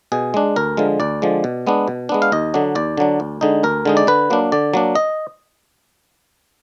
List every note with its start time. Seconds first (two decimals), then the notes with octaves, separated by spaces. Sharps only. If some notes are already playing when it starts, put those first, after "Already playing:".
0.12 B2 G#4
0.34 G#3 D4
0.56 D2 A#4
0.77 D3 F3 G#3
1.00 D2 D5
1.22 D3 F3 G#3
1.44 B2
1.67 G#3 B3 D4
1.88 B2
2.09 G#3 B3 D4
2.22 F5
2.32 D#2 D#5
2.54 D3 F#3 D4
2.75 D#2 D5
2.97 D3 F#3 D4
3.20 D2
3.41 D3 G#3 D#4
3.63 D2 A#4
3.85 D3 G#3 D#4
3.97 D5
4.07 D3 B4
4.30 F#3 A#3 D4
4.52 D3 D5
4.74 F#3 A#3 D4
4.95 D#5